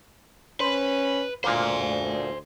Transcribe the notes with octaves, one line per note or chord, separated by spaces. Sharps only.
C#4 B4 C5
D2 A#2 A#3 C5 G#5